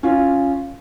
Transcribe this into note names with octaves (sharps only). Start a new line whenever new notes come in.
C#4 F4